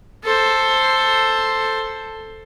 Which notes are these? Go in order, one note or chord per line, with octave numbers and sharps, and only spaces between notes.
A4 C5